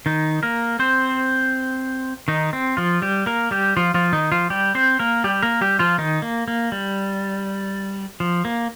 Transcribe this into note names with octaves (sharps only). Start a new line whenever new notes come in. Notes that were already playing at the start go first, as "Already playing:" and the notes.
D#3 D#4
A#3 A#4
C4 C5
D#3 D#4
C4
F3 F4
G3 G4
A#3 A#4
G3 G4
F3 F4
F3 F4
D#3 D#4
F3 F4
G3 G4
C4 C5
A#3 A#4
G3 G4
A#3 A#4
G3 G4
F3 F4
D#3 D#4
A#3
A#3
G3
F3
A#3